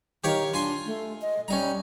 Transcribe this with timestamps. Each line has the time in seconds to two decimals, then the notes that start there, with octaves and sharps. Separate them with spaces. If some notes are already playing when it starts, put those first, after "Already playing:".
0.24 D#3 G4 C#5 F5
0.53 D4 F4 G#5 C6
0.86 A3
1.21 D#5
1.48 G3 C#4 D#4 A#5